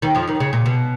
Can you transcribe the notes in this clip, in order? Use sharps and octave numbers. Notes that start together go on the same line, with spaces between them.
D#2 D#3
F2 F3
D#2 D#3
C#3
A#2
B2